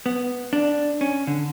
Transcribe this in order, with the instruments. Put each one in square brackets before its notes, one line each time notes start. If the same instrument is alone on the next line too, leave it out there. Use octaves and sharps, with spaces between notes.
[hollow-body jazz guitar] B3
D4
C#4
D3